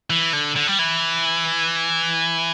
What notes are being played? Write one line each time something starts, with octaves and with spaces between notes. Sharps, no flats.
E3
D3
D3
G3
E3